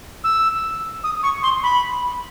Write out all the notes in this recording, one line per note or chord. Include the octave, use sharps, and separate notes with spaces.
E6
D#6
C#6
C6
B5